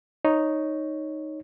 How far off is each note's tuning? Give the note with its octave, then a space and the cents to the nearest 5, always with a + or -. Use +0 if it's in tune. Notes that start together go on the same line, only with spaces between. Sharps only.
D#4 +0 C#5 +0